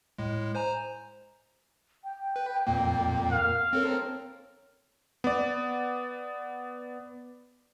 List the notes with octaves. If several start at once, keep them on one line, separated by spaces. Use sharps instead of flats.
A2 G#3
C5 G#5 A#5
G5
B4
F2 A#2 A#3
A#4 F5
C4 A4 A#4 C#5
B3 D5